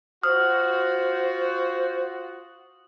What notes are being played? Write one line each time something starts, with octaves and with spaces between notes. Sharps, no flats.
F4 F#4 C5 D#6 F6